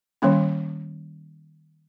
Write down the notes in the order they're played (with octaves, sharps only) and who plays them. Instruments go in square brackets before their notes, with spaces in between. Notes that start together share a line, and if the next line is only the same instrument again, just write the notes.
[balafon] D#3 G3 A#3 C#4